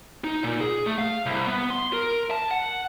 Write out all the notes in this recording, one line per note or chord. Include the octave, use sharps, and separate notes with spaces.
D#4
A#2
G#4
A3
F5
C2
B3
C6
A#4
A5
F#5